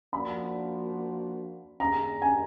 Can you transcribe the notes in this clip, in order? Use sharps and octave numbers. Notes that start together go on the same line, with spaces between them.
F3 A#3 D4 F#4 D5 B5
D#3 A#3 D4 G#4 A#5
G#5